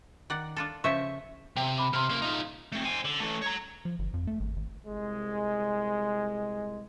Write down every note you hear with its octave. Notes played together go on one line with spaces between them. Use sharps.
D#3 D5 F#5
D4 F4 A4
C#3 F3 C5 E5 C#6
C3 G5
B5 D6
C3 C6 F6
C#3 A#3
D#4 F4
A3 C4
C5 G#5
D3
E3 A3
C#5 A#5
F3
G1
F2
A3
G#1
G#1
C2 G#3